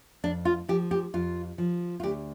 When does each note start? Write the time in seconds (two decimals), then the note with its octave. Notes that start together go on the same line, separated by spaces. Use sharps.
0.24 F2 D4
0.45 F4
0.68 F3 G4
0.91 G4
1.14 F2 F4
1.58 F3
2.00 F4
2.03 D2 G4